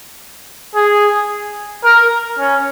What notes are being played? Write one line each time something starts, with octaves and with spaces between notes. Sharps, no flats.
G#4
A#4
C#4